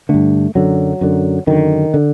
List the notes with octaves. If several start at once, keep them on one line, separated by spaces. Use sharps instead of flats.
G2 D3 A3
F#2 D3 F#3
F#2 D3
F#2 D3 D#3
D3